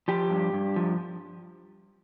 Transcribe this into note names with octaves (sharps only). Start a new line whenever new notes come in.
F3 G4
G2
G2
F3